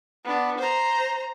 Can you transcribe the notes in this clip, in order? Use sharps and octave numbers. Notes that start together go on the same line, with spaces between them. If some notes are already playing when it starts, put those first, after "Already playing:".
B3 D4
C5 A#5